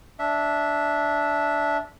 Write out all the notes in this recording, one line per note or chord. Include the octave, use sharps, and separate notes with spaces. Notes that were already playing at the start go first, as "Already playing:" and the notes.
D4 E5